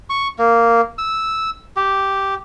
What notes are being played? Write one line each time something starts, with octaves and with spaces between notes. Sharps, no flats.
C#6
A#3
E6
G4